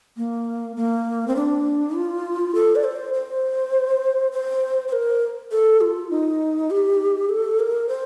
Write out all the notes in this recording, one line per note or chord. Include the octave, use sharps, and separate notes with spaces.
A#3
A#3
C4
D4
F4
A4
D5
C5
C5
C5
C5
A#4
A4
F4
D#4
G4
A4
A#4
C5